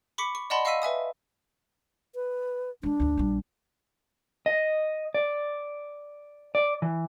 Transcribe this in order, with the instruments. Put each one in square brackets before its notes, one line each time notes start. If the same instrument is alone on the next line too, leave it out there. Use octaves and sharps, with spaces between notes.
[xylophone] B5 C#6 D6 B6 C#7
C#6
D5 D#5 F#5 A5 B5 C6
D#5 F5 C#6 E6 B6 D#7
B4 E5 G#5 D#6
[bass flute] B4
[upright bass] G#3 C4 [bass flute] D4
[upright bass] D2 G#2
A#1 G3
[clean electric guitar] D#5
D5
D5
E3